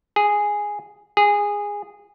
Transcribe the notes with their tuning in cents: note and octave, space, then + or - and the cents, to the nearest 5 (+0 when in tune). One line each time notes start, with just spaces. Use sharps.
G#4 -5
G#4 -15